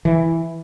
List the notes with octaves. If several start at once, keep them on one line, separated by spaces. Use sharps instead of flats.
E3